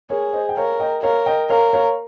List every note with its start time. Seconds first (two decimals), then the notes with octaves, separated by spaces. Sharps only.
0.10 G#4 A#4 C#5
0.33 C5 D#5
0.49 G5
0.57 A#4 C#5 F5
0.80 D#5 G5
1.03 A#4 C#5 F5
1.26 D#5 G5
1.49 A#4 C#5 F5
1.73 C#5 F5